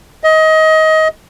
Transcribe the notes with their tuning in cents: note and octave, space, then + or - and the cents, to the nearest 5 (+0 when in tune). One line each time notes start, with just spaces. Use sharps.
D#5 +25